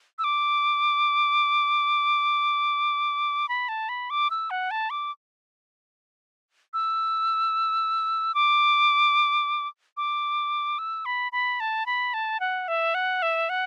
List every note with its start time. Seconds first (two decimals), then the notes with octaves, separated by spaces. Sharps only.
0.19 E6
0.24 D6
3.49 B5
3.69 A5
3.89 B5
4.10 D6
4.30 E6
4.50 F#5
4.71 A5
4.90 D6
6.74 E6
8.35 D6
9.97 D6
10.79 E6
11.05 B5
11.32 B5
11.60 A5
11.86 B5
12.14 A5
12.40 F#5
12.68 E5
12.94 F#5
13.22 E5
13.49 F#5